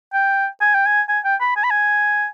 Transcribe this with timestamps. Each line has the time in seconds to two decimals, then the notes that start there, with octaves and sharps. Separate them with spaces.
0.14 G5
0.61 G#5
0.75 G5
0.86 G#5
1.09 G#5
1.25 G5
1.41 B5
1.56 G#5
1.64 B5
1.70 G#5